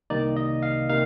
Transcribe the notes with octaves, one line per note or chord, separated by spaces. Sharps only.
C2 C3 D#3 A#3 D#4 D5
D#5
F5
C3 D#3 A#3 D#4 F5